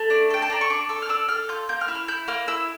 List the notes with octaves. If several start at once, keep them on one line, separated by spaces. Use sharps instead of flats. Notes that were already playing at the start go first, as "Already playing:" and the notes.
Already playing: A3
D4
A4 G5
A5
D4 A#5
C#6
D4 D6
A4 C#6
F6
D4 E6
A4 F6
F4 G6
A#3 G6
F6
E4
F6
E4 G6
A#3 F6
E4 E6